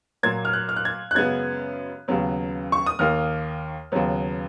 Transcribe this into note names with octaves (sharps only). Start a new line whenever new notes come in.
A#2 F#3 A#3 G#6
F6
F#6
F6
F#6
G#6
F#6
F#2 C#3 G#3 B3 G#6
D#2 C#3 F#3 B3
C#6
D#6
D#2 D#3 A#3 F6
D#2 C#3 F#3 B3